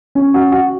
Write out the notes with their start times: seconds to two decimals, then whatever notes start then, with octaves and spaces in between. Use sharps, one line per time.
0.15 C#4
0.34 F#4
0.52 F#4